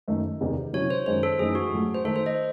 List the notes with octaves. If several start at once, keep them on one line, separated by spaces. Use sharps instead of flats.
F#2 D#3 A3 D#4
E2 C3 D#3
C3 F#3 C#4 E4 C#5
C5
F#2 D#3 G#3 C5
A4
F#2 E3 A3 D#4 G#4
F#4
A2 F#3 A3
C5
D#3 A3 D#4 A4
C5
D#5